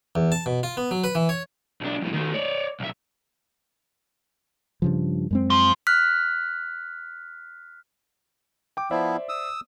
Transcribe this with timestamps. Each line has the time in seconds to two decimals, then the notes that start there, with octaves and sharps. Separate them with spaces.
0.15 E2
0.32 A5
0.46 B2
0.63 F4
0.77 B3
0.91 F#3
1.04 B4
1.15 E3
1.29 C#5
1.81 B1 D4
2.02 F2 A2
2.14 D#3 A3
2.34 C#5 D5
2.80 B1 E5
4.82 G2 C#3 F3
5.31 F#2 G#3 C4
5.50 F3
5.87 F6 F#6 B6
8.77 G5 D6
8.91 F3 B3 E4 C5 D5 E5
9.29 D#6 E6